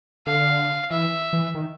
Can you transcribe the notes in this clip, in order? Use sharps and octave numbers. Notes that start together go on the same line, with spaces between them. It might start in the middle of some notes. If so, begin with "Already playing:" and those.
D3 F5
E3 E5
E3
D#3